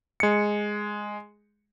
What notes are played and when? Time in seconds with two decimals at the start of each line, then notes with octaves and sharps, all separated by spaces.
0.20 G#3 C#7